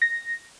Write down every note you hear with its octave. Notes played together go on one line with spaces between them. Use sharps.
A#6